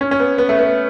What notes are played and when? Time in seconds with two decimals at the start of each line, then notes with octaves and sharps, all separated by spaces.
0.01 C#4
0.11 C#4
0.20 B3
0.38 B3
0.49 A3
0.59 B3